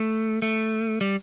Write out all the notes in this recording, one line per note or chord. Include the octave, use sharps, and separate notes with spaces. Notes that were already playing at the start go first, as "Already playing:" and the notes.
Already playing: A3
A3
G3